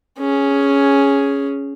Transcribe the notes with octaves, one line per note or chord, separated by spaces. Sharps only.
C#4 G#4